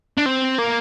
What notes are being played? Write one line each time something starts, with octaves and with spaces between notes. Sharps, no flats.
D4
C4
A#3